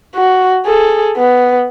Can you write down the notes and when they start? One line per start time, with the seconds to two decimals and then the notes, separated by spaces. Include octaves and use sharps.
0.15 F#4
0.66 G#4 A4
1.17 B3